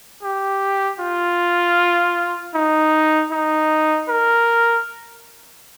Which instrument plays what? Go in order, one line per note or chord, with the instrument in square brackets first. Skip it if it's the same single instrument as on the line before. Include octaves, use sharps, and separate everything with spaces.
[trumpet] G4
F4
D#4
D#4
A#4